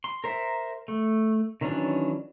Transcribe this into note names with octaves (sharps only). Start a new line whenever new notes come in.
C6
A#4 C5 E5
A3
D#3 E3 F#3 C#4 D4